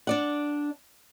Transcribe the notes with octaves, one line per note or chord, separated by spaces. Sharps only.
D4 D5 F#5